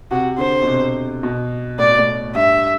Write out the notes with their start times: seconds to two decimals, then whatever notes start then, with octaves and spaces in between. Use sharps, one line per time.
0.11 C3 F#4
0.38 D3 C5
0.62 B2
0.67 C3
1.23 B2
1.79 A2 D5
1.89 B2
1.99 A2
2.35 G2 E5